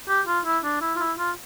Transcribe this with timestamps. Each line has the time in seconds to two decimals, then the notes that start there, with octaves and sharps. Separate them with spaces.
0.08 G4
0.27 F4
0.45 E4
0.64 D4
0.81 E4
0.96 F4
1.00 E4
1.18 F4